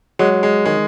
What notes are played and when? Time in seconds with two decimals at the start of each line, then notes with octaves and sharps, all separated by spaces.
0.19 F#3 G#3
0.43 G#3
0.66 D#3 G#3